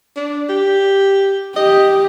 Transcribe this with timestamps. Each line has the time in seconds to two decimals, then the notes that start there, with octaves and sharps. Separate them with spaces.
0.16 D4
0.49 G4
1.56 G4 D#5